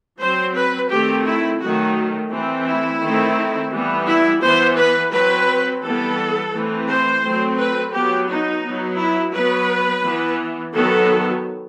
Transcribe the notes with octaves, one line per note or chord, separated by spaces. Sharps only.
F#3 C4 C5
B4
D#3 A3 C4 G4
E4
D#3 F#3 A3 F#4
E3 A3 C4
E4
D#3 A3 C4
E3 G3 B3
E4
E3 B3 C5
B4
F#3 C4 B4
E3 G3 B3 A4
E3 A3 C4
C5
F#3 A3 C4
B4
F#3 B3 G4
D#4
F#3 B3
E4
F#3 B3 B4
E3 B3
D#3 F#3 B3 A4